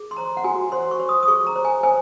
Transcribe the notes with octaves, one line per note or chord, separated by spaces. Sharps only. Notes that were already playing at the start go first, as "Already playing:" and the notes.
Already playing: G#4
C6
C5 A#5
F#5
F#4 G#5
C5 C6
C#6
C5
D#6
D#6
G#4 C#6
A#5
C5
G#5
C5 G#5